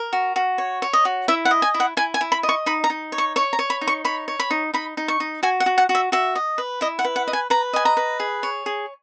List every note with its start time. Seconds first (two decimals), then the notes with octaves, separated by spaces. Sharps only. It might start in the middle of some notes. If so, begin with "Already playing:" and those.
Already playing: A#4
0.13 F#4
0.36 F#4
0.58 C#5
0.82 C#5
0.93 D#5
1.05 F#4
1.28 E4 E5
1.45 F#5
1.51 D#5
1.62 G#5
1.74 E4
1.80 F#5
1.97 E4 G#5
2.14 G#5
2.21 E4
2.32 B5
2.43 D#5
2.49 C#6
2.66 D#4 B5
2.84 A#5
2.90 D#4
3.12 C#5
3.18 C#6
3.36 C#5 C#6
3.53 A#5
3.59 C#5
3.70 B5
3.81 D#4
3.88 C#6
4.05 C#5 B5
4.28 C#5
4.39 B5
4.51 D#4
4.74 D#4 B5
4.97 D#4
5.08 C#6
5.20 D#4
5.43 F#4 G#5
5.60 F#5
5.66 F#4
5.78 F#5
5.89 F#4
5.95 E5
6.12 F#4 E5
6.35 D#5
6.58 B4
6.81 E4 D#5
6.99 F#5
7.05 B4
7.16 F#5
7.28 D#5
7.33 G#5
7.50 B4 A#5
7.73 D#5 G#5
7.85 A#5
7.97 B4
8.20 G#4
8.43 C#5
8.66 G#4